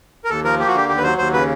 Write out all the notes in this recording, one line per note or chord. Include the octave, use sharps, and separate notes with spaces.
A#4
D#2 A4
F3 A#4
A#3 G4
F#4
D3 G4
D#2 G4
B4
F#3 C5
D#2 C5
C#3 B4